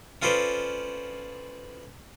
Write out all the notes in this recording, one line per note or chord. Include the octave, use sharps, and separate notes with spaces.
C#4 F4 A4 B4 C5 D5